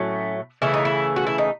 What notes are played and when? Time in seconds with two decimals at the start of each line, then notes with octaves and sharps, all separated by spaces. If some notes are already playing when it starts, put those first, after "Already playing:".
Already playing: A2 F#3 A3 C#4
0.62 C#3 E3 A3 E4
0.74 D#4
0.85 E4
1.16 F#4
1.27 E4
1.38 D#4